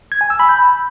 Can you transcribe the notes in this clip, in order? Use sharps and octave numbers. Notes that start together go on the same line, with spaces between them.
G#6
G#5
E6
B5
G6